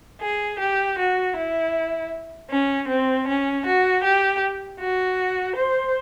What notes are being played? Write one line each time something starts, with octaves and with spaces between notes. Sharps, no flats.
G#4
G4
F#4
E4
C#4
C4
C#4
F#4
G4
F#4
C5